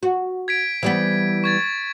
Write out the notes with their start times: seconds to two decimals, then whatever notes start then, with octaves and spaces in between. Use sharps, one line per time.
0.03 F#4
0.48 G#6 B6 D7
0.83 E3 G3 B3
1.44 C#6 G#6 A6